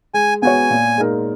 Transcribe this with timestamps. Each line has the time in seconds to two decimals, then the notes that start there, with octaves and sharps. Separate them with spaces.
0.14 G#3 G#5
0.42 B3 F#4 C#5 G#5
0.70 A#2
0.97 G#3 D#4 A#4